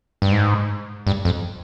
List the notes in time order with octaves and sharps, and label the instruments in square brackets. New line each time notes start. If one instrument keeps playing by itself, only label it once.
[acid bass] G2
G#2
G2
F2